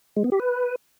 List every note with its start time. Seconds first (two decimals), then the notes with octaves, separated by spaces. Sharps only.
0.16 G#3
0.24 B3
0.32 G4
0.40 B4